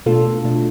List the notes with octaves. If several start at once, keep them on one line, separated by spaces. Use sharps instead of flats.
B2 A3 D4 F4 A4
B2 A3 D4